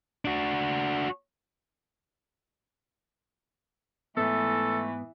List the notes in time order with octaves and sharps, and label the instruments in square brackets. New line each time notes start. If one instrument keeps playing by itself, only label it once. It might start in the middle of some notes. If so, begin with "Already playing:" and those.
[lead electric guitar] D4 F#4
[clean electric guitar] G#2 B3 [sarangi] E3 [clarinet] A3 [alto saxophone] A4